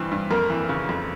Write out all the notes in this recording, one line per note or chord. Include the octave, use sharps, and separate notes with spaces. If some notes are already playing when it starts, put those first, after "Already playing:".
Already playing: G2 E3 C4
G2
F2 A#3 A#4
E3
C#3
F2